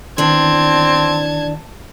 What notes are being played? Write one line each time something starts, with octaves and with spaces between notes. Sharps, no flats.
E2 D#3 C4 D4 A5 G#6